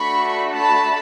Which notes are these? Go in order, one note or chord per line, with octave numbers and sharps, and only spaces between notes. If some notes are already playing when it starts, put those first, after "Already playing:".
Already playing: A3 D4 F#4 A4 B5 C#6
A5 B5